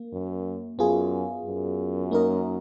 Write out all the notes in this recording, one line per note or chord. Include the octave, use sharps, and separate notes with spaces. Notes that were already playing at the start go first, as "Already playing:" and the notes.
Already playing: A#3
F#2
F#2 B3 F4 G#4
F#2
A#3 D#4 A#4 D#5